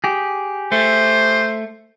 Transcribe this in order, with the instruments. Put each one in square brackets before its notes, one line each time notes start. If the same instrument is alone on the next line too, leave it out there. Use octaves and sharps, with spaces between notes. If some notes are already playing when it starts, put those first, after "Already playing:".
[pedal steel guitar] G4 G#4
[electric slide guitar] A3 [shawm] C5